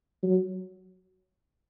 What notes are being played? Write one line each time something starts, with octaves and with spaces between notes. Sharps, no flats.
F#3